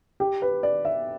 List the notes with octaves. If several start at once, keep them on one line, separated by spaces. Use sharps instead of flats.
G4
B4
D5
E5